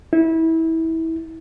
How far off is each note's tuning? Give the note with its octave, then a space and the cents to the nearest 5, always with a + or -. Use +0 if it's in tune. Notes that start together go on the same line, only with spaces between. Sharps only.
E4 -25